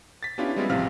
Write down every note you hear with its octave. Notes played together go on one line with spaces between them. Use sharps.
A6 B6
B3 C#4 D4 E4 F4 G4
G3 G#3 B3 C4 E4 F4
A1 C3 F3 C4 F5 F6